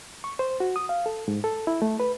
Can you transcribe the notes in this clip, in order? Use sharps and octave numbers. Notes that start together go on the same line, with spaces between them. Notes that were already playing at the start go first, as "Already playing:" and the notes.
C#6
C5
F#4
D#6
F5
A4
G#2
A4
E4
A3
B4